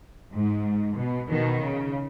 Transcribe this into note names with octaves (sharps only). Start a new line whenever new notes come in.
G#2
B2
B2 D#3
C#3